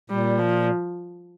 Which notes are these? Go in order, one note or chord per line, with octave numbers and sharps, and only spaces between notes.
A#2 G3
F3